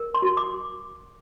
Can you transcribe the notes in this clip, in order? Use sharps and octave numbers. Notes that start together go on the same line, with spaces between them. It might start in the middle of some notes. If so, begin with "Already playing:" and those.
Already playing: A#4
C6
F#4
D6